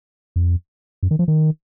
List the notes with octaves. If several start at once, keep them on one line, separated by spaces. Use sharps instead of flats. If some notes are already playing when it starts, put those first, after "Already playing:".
F2
F#2
D#3
F3
D#3